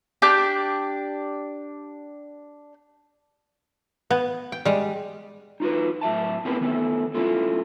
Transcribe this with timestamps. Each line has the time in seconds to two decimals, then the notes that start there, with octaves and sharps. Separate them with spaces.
0.22 D4 G4 A5 G6
4.10 B3
4.52 G5
4.65 G3 G#3
5.60 D#4 F4 F#4 B4
6.01 A2 F#3 E5 A5
6.45 B3 C4 E4 G#4 A#4 B4
6.61 D#3 A3 B3 A4
7.14 A3 C#4 E4 F4 A4